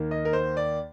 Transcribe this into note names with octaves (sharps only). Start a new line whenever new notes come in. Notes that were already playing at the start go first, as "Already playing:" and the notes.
Already playing: D#2 D#3 A#3
D#5
A#4
C5
D5